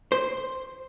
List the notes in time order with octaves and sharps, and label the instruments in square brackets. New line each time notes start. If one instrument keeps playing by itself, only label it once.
[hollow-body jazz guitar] C5